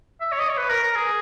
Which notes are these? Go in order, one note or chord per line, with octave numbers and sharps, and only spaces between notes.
E5
C#5
D#5
C#5
B4
A#4
A#4
G#4